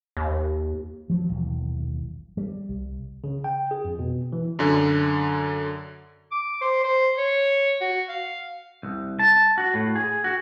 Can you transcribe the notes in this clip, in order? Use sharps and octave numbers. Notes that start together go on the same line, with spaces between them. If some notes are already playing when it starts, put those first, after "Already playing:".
D#2
F3 F#3
D#1 B1 E3
G3
C2
C#3
G5
G#4
F2
B2
E3
F#2 D3
D6
C5
C5
C#5
F#4
F5
C2
A5
F#4
A2
G#4
F#4